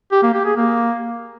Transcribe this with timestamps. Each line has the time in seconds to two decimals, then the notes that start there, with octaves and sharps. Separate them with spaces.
0.12 G4
0.23 A#3
0.34 G4
0.45 G#4
0.56 A#3